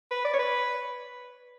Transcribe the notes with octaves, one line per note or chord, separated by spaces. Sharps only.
B4
D5
C#5
B4